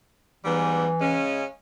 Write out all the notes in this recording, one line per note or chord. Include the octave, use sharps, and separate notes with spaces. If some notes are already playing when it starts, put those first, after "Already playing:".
G#2 E3 G3 B3
C#3 G#3 C#4